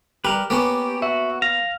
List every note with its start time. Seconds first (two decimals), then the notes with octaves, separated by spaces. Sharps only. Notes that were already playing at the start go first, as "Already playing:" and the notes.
0.25 G3 G4 A#4 B4
0.50 A#3 B3 C#4 G4
1.02 F#4 E5
1.42 F5 A#6